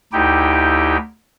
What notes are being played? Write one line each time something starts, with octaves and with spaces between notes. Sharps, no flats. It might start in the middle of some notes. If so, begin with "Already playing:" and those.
D2 D#4 E4 G4 G5